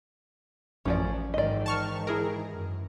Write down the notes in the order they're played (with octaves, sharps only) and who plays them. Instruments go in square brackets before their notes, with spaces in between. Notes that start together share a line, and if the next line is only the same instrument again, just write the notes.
[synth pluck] A1 F#2 F3 [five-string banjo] C#4 D5
[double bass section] G#2 D#3 E3 [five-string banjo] D5 D#5
[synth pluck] A5 C#6 F6
E4 G#4 A#4
[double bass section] F#2